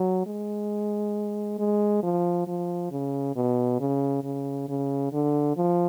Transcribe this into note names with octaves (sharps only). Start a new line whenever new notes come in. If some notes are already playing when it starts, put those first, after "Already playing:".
Already playing: F#3
G#3
G#3
F3
F3
C#3
B2
C#3
C#3
C#3
D3
F3